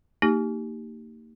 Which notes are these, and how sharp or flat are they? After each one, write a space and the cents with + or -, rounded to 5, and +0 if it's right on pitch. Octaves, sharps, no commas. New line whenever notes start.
A#3 -30 D#4 +0 G4 +0